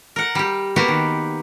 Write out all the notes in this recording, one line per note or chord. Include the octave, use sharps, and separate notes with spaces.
A#4 F#5
G3 G4
A#3 B3 F#4 G4 B4
D#3